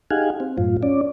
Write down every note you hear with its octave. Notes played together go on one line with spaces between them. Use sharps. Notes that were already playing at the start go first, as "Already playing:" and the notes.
D#4 G4 G#4 F5 F#5 G#5
C4
F#2 A2 F4
C#4 D5